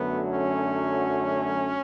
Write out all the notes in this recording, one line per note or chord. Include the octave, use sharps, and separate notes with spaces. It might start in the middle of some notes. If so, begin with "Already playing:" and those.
Already playing: F#2 D3 F#3 A3 B3
C#4